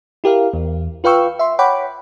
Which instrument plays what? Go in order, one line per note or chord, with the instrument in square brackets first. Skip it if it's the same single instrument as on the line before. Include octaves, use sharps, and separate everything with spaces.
[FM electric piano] E4 G4 A#4 F5
E2
F4 B4 F5 G5 C#6 E6
E5 C6
C#5 F#5 G5 B5 D6